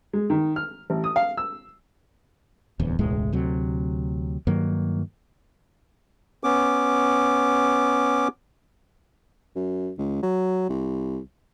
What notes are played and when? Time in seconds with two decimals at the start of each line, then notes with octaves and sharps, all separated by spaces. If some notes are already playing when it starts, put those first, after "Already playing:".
0.13 G#3
0.30 D#3
0.56 F6
0.90 A1
1.04 D#6
1.16 F5
1.37 E6
2.80 D1 E2
2.99 E1 C#2 A2 G#3
3.32 D2 C3 F#3
4.47 G2 D#3 F#3 A#3
6.44 B3 C#4 D6
9.56 F#2
9.98 C#2
10.23 F#3
10.69 C2